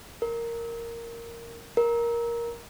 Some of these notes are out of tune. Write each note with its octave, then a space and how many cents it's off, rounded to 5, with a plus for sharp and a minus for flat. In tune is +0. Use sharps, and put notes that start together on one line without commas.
A#4 -5
A#4 +10